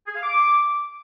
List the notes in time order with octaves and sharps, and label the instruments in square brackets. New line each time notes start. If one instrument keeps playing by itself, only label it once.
[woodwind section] G#4
F5
D6